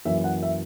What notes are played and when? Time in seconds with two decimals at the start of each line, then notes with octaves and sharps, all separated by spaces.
0.05 F#2 E3 A#3 E5
0.24 F#5
0.43 E5